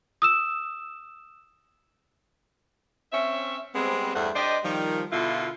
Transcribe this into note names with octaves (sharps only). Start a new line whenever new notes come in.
D#6 E6 E7
C4 C#4 C#5 E5
G3 G#3 B3 C4
E2 G2 G3 A3 C5 F#5
D4 G4 C5 D5 D#5
D#3 F3 G3
B2 D3 E4 F4